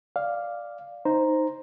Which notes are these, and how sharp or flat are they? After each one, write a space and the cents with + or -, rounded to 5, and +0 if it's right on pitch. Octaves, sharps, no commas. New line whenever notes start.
D5 +0 F5 +0
D#4 +0 C5 +0 A#5 +0